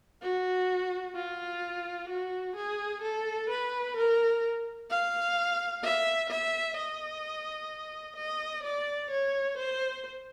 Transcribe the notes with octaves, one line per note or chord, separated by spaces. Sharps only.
F#4
F4
F#4
G#4
A4
B4
A#4
F5
E5
E5
D#5
D#5
D5
C#5
C5